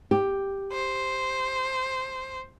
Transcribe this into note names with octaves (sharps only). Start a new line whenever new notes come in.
G4
C5